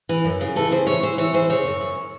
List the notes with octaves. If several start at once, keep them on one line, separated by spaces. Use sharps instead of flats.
E3
F#2
C#3
E3 A4
C#3 C5
E3 C#5
E3 C5
E3 C#5
E3 C5
C#3 C#5
F#2
F#2